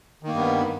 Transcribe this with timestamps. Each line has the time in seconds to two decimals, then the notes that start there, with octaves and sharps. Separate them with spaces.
0.23 D#3
0.28 A#3
0.33 G2
0.38 B3